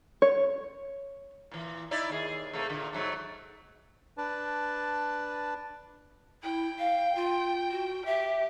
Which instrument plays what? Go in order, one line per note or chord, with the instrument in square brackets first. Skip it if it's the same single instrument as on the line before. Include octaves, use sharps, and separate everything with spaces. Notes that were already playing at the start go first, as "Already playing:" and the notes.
[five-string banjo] C#5
[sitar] A#2 E3
D#4 E4 D5
D#2 G#4
C3 A3 A#3
A#2 D3
G#2 F#3 A3
[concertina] D4 B4 A5
[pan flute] E4 [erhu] G5
[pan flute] F5
F4
F#4
[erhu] G4 [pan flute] E5